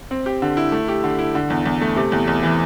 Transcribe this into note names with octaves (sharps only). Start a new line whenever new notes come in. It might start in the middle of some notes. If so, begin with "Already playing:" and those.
C4
G4
D3
E4
A3
G4
D3
E4
D3
E2
E2
A3
C3
E2
E2
E3